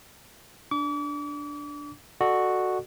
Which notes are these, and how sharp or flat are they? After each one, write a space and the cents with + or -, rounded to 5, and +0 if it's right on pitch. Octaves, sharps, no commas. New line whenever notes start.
D4 +0 D6 -40
F#4 +0 A4 +0 D5 +40